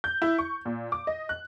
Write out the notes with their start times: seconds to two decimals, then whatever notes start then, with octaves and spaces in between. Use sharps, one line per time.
0.04 G6
0.22 E4
0.38 C#6
0.65 A#2
0.92 D6
1.07 D#5
1.29 F#6